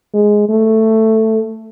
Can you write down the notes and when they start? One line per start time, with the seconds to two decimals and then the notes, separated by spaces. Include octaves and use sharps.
0.13 G#3
0.49 A3